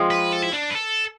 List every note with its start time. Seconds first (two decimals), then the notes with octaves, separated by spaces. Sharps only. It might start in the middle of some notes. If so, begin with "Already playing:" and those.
Already playing: F3 G#3 C4
0.11 B4
0.33 A4
0.43 E4
0.53 D4
0.70 B4
0.75 A4